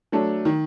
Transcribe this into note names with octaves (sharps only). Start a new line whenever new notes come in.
F#3 A3 D4
D#3